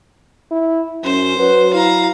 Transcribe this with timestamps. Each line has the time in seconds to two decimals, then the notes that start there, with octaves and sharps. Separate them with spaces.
0.51 E4
1.04 F#2 C#4 C5
1.38 F#3 B4
1.73 E4 F5 A#5